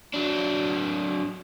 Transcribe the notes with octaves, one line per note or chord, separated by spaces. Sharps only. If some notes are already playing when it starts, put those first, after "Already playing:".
F#3 D4